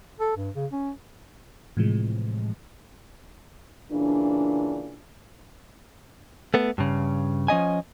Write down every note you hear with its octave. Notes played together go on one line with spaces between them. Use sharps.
A4
G2
C#3
C#4
A2 C3 E3 F3 G#3
A#2 C#3 E3 D4
A3 B3
G2 C#3
F3 C#4 D#5 G#5